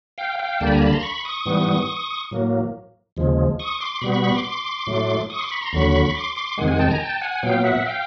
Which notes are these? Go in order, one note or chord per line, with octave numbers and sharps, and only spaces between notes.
F5 G5
F5 G5
D2 D3 G3 A#3 G5 A5
B5
G#5 A#5
A5 B5
A#5 C6
B5 C#6
C#6 D#6
G#2 E3 G3 B3
A2 F#3 A#3
D#2 C#3 F3 G#3
C#6 D#6
C6 D6
B2 G3 B3 B5 C#6
B5 C#6
B5 C#6
C6 D6
C6 D6
A2 F#3 A3
C#6 D#6
C6 D6
B5 C#6
A#5 C6
D#2 D3 F#3 B5 C#6
C6 D6
C6 D6
F2 C3 D#3 G#3 F#5 G#5
F#5 G#5
G5 A5
G#5 A#5
G5 A5
F#5 G#5
A#2 F#3 B3 F5 G5
E5 F#5
F5 G5